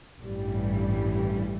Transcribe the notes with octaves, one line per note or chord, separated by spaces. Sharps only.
A1 G2 E3 G3